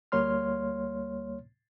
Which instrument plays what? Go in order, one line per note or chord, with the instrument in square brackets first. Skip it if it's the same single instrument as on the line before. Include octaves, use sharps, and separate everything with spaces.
[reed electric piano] D2 G3 A#3 C#5 C6 F6